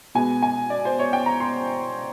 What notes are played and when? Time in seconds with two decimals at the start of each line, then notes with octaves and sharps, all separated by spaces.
0.15 B2 G#3 B3 G#5
0.42 G#5
0.70 D5
0.85 C5
0.99 C#5
1.13 G5
1.26 A#5
1.40 C6